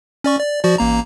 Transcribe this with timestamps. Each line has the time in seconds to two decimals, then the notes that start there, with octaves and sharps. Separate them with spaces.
0.24 C#4 D5 C#6
0.39 D5
0.64 F3 F#4 D5
0.78 A1 A#3 A#5